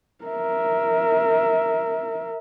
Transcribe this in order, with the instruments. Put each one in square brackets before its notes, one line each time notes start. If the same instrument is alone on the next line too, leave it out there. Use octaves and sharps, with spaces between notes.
[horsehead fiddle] A#4 E5